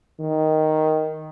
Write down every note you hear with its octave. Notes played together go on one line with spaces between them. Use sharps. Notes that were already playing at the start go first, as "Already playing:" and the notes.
D#3